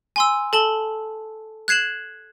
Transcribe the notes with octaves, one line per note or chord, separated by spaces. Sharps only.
G#5 C6 E6
A4 A5 F#7 G7
F#6 G#6 C7 E7 F#7